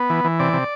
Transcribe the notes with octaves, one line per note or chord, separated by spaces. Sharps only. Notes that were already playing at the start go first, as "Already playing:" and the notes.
Already playing: B3
E3
E3
C3 D5
C3